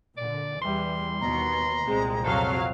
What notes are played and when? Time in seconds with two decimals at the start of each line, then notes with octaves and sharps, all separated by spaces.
0.18 A#2 D3 D5
0.62 E2 E3 G3 C6
1.21 D#2 B2 A#5
1.87 C2 A#2 G#3 C4
2.24 F2 F#3 A4 F5